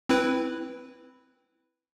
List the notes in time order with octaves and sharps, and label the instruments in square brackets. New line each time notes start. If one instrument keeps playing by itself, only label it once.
[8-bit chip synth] C4 E4 B4